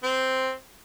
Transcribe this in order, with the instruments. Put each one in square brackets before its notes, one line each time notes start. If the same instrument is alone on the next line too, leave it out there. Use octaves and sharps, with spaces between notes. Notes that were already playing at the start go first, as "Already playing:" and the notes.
[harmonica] C4